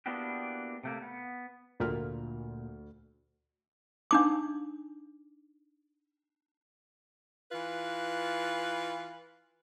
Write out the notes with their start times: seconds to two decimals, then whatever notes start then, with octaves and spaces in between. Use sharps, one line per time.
0.06 A#3 B3 D4 E4 F#4 G4
0.84 C3 A3 A#3
1.02 B3
1.80 D2 A#2 F6
4.11 D4 D#4 D6
7.52 E3 F4 B4